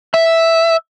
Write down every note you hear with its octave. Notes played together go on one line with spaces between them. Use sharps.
E5